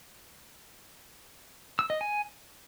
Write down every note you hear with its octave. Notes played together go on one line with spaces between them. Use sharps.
E6
D#5
G#5